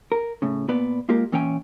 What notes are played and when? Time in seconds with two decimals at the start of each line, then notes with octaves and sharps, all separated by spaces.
0.12 A#4
0.42 A2 C#3
0.68 A#2 B3 B4 D5
1.09 G#3 A#3 F4 G4 A#4
1.32 A#2 E3 C#4 C#5 G5 G#5